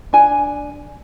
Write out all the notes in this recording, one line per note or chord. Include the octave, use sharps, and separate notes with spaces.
D4 G#5